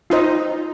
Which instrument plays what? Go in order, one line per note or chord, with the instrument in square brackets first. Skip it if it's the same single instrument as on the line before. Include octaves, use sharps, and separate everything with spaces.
[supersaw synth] D#4 [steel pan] F4 C5 D#5